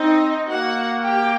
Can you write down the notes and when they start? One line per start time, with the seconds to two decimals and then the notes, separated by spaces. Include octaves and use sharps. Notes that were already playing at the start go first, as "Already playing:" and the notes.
Already playing: C4 D#4 D#5
0.48 A#3 F#4 F#5
1.03 G4 G5